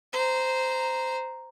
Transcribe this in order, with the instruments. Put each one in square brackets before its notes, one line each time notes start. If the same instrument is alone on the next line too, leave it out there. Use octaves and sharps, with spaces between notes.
[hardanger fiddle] C5 A#5